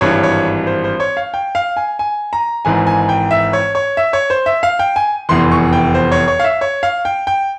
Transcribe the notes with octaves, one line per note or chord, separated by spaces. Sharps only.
G#1 G2 E3 C#5
C#5
C5
C5
C#5
F5
G5
F5
G#5
G#5
A#5
G#1 G#2 E3 G#5
G#5
G5
E5
C#5
C#5
E5
C#5
C5
E5
F5
G5
G#5
F1 E2 E3 C6
C#6
G5
C5
C#5
C#5
F5
E5
C#5
F5
G5
G5